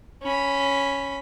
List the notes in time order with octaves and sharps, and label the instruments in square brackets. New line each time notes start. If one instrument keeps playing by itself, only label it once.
[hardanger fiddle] C#4 B5